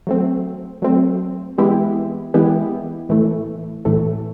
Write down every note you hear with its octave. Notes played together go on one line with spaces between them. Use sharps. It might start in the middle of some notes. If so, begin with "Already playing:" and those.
F#3 A3 C4
F#3 A3 C4
E3 G#3 B3 E4 G4
E3 G#3 B3 E4 G4
A2 E3 A3
A2 E3 A3